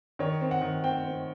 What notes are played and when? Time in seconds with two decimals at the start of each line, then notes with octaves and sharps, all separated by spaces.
0.19 D#3 C#5
0.41 C4
0.51 F#5
0.61 D#3
0.84 C4 G5
1.04 C4